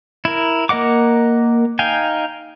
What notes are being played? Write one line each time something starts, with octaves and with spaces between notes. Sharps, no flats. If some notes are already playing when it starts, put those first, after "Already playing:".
E4 A#4
A#3 A#4 D#5 F#5 D6
D#4 F5 G5 G#5